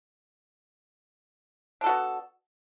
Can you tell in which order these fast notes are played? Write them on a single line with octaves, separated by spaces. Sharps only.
D4 A4 F#4 B3